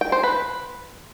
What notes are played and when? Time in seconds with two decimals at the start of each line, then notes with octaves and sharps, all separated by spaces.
0.01 G5
0.12 C5
0.23 B4